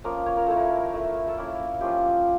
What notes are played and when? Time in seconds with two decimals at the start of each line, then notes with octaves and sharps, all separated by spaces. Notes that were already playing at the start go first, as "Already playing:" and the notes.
0.04 F3 A#3 C#4 A#4
0.26 C#5
0.37 A#4
0.47 A3 E4 A4
0.56 A#4
0.93 A3 E4
1.28 A4
1.37 A#3 C#4 E4 A#4
1.81 F3 C#4 F4 G4